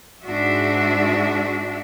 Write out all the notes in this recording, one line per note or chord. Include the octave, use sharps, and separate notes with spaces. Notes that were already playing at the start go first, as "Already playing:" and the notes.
G#2 D4 F#4 E5